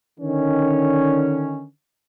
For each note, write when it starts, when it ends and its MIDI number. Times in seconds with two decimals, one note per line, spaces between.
0.19 1.65 50
0.19 1.65 51
0.19 1.65 61